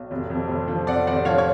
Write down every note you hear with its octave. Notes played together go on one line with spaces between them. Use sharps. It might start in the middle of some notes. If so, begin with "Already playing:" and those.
Already playing: B1
F1
F2
F1
F3
F1 D5 F#5
F1 D5 F#5
F3 C#5 F5
C#5